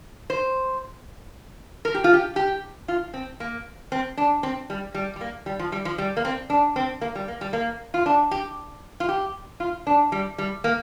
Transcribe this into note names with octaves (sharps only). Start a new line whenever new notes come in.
C5
A#4
G4
F4
G4
G4
F4
C4
A#3
C4
D4
C4
G3
G3
G3
A#3
G3
F3
G3
F3
G3
A#3
C4
D4
C4
A#3
G3
A#3
G3
A#3
F4
D4
G4
F4
G4
F4
D4
G3
G3
A#3